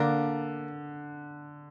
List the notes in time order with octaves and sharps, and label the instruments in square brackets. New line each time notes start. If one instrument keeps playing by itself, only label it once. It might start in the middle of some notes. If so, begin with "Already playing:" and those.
Already playing: [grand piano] D3 [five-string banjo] A#3 D4 A#4